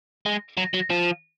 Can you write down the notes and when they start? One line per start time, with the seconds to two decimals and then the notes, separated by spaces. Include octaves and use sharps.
0.26 G#3
0.57 F#3
0.74 F#3
0.90 F3